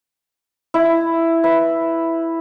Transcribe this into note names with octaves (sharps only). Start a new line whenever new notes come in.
E4
B4 E5